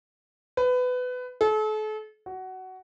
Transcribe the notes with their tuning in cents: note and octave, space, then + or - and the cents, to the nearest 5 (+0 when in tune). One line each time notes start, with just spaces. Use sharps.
B4 +20
A4 -40
F#4 +15